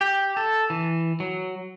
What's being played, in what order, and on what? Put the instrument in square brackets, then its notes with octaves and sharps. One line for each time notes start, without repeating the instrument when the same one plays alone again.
[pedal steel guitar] G4
A4
E3
F#3